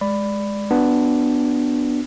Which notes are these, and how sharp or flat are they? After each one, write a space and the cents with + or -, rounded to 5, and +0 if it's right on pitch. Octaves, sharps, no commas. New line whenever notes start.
G#3 +0 D5 +0 B5 +10
B3 +0 D4 +0 F#4 +0